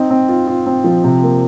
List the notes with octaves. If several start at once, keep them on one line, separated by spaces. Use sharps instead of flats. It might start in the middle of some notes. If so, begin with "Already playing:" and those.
Already playing: C4 D#4
C4
F4
F4
C4
F3
C3
A#3